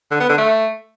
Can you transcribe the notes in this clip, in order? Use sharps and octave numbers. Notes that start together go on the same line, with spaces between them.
D3
B3
D3
A3